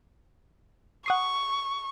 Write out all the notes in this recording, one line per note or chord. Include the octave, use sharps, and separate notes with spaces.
F#5 C#6 D#6 C7